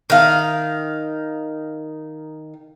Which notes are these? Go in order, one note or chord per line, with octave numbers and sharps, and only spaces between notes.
D#3 F5